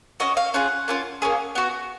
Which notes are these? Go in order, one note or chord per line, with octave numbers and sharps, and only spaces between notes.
C#4 F#4 D#5
F5
C#4 F4 G#4 F#5
A#3 C#4 F4
A#3 C#4 G#4
B3 F#4